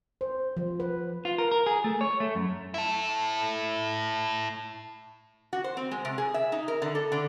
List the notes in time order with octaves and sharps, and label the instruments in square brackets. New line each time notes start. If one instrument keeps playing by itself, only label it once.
[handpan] C5
F3
B4
[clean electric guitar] F4
A#4
A#4
G#4
A3
C#5
A3
F#2
[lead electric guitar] E4 A4
[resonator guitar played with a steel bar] F#4
C5
C4
G#3
C3
G#4
E5
D#4
A#4
D3
A4
D3